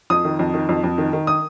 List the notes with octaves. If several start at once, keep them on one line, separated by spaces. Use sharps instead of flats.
F2 D#6
D#3
F2
D#3
F2
F2
D#3
D#3
D#6